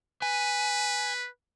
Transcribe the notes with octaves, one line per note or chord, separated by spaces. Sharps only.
B4 G#5